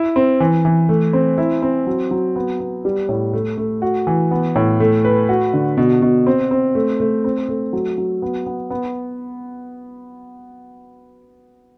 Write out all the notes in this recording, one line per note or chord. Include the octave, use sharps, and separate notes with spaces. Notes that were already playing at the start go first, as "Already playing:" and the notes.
Already playing: E4
C4
E3
E3
A3
C4
E4
C4
F#3
F#3
B3
B3
G3
A2
A3
A3
F#4
E3
B3
A2
A3
B4
F#4
D3
B2
B2
C4
C4
A3
A3
C4
A3
F#3
F#3
B3
B3
B3